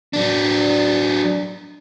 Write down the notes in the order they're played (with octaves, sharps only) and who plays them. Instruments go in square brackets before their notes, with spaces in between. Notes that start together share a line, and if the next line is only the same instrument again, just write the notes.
[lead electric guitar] F#3 D4